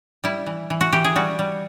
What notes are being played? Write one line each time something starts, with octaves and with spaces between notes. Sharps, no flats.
G3 E4
E3
E3
F#4
E3 G4
G#4
G3 F#4
G3